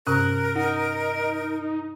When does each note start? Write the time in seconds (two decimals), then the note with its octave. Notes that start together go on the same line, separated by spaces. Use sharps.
0.07 G2 C3 C#4 A#4 F#6
0.56 D#4 F#5